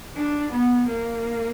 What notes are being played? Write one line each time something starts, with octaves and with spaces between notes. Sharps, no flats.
D4
B3
A#3